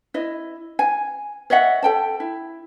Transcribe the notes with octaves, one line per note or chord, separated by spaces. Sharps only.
E4 D#5
G#5
C#5 D#5 E5 F#5
A4 G5 A5
E4